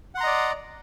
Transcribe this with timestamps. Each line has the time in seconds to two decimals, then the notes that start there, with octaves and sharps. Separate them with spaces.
0.15 F#5
0.18 C6
0.21 A#5
0.24 D#5
0.27 D5